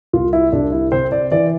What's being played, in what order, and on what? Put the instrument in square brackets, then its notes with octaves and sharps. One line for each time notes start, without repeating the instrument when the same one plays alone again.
[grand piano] C2 F4
E4
C2 D4
E4
C3 C5
D5
E3 D5